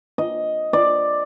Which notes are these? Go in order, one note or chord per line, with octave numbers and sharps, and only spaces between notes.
D#5
D5